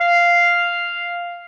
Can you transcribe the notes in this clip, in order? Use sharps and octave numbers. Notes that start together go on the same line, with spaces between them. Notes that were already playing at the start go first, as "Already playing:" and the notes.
F5